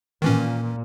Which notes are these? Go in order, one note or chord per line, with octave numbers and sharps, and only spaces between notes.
A#2 D#3 E3 C#4